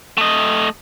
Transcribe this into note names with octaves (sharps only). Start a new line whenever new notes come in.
A3 D#5